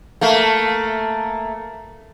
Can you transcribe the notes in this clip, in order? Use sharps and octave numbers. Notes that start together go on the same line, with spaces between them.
A3 A#3